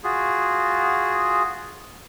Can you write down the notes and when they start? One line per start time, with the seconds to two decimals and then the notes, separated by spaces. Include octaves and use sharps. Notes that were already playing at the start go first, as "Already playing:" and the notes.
0.04 F4 F#4 G#4